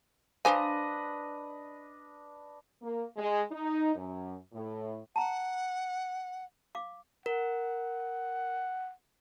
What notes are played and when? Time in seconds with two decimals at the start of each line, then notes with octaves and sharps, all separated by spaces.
0.45 F3 D4 B4 C5 D#5 G#5
2.82 A#3
3.17 G#3
3.52 D#4
3.95 F#2
4.53 A2
5.16 F#5 A5 A#5
6.75 F5 D6
7.26 A#4 F#5